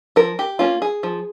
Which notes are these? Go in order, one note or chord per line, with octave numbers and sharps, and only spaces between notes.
F3 A#4
G4
A#3 C#4 F4
G#4
F3